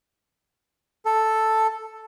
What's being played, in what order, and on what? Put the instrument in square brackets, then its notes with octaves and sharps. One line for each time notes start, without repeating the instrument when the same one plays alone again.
[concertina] A4